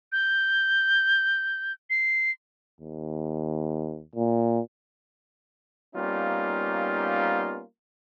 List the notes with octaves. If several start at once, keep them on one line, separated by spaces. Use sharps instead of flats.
G6
C7
D#2
A#2
G3 A#3 B3 C#4 D#4 F4